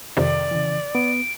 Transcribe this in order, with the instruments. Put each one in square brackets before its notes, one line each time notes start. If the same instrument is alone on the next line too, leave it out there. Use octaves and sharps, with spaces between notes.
[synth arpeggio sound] F2 C3 D#3 [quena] D5
[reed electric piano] C#3 E3
[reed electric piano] B3 [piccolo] D7